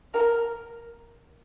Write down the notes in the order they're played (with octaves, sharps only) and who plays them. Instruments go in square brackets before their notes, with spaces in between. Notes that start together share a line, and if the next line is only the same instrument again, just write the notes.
[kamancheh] A#4